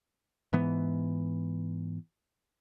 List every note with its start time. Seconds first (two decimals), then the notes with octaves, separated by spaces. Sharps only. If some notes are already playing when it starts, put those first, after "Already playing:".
0.53 G#2 E3 B3